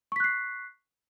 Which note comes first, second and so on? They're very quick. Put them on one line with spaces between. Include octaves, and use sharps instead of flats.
C#6 B6 F#6 C7